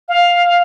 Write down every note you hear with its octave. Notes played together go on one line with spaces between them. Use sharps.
F5